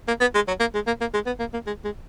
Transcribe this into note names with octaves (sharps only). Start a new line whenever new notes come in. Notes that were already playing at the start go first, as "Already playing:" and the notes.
A#3
B3
G#3
F#3
A#3
G#3
A#3
A#3
G#3
B3
A#3
A#3
G#3
G#3